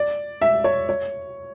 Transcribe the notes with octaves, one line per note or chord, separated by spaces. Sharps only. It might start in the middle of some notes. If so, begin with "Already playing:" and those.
Already playing: D5
E5
C#5
C#5